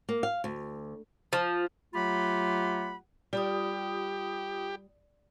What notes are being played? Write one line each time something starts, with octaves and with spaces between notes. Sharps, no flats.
A#3
F5
D2
F3
F#3 A3 F4 G4 F#5 B5
G3 F4 G4 B5 D#6